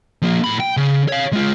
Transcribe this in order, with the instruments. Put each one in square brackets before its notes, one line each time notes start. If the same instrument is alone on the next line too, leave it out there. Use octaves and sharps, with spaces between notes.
[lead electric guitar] F3 A#3
A2 B5
G5
C#3
C#5 F5
G#3 F4